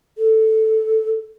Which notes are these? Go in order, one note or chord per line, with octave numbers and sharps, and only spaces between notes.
A4